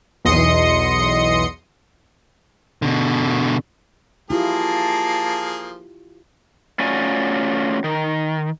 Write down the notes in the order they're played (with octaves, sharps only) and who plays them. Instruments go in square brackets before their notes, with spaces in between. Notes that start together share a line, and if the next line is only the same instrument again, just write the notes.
[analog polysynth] B1 E2 D#5 C6 D#6 C#7
[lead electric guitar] B2 D3
[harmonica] F3 A#3 G#4 [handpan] E4 F4 G4 [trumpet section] A5
[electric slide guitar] A3 C#4 F4 F#4 D5 G#5
D#3